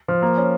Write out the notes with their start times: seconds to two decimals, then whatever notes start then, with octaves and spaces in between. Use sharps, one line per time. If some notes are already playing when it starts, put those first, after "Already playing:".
0.08 F3
0.22 A#3
0.37 C#4